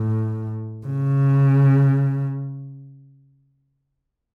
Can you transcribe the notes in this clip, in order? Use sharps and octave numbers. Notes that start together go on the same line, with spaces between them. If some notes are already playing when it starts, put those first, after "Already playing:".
Already playing: A2
C#3